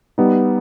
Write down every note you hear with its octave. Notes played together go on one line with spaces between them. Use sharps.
G3 B3 D#4